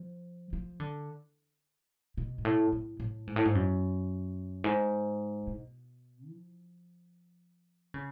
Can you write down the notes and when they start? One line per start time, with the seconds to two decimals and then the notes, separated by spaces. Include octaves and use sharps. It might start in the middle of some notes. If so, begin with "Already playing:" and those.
Already playing: F3
0.53 F3
0.80 D3
2.17 B2
2.38 G#2
2.45 A2
2.72 A2
3.00 A2
3.27 G#2
3.36 A2
3.45 G#2
3.55 F#2
4.64 G#2
5.47 B2
6.29 F3
7.94 C#3